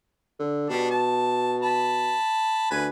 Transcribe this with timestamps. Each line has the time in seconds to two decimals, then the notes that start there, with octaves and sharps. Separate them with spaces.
0.39 D3
0.70 B2 G3 D4
0.91 A5
1.62 A5 B5
2.71 D2 B4 G#5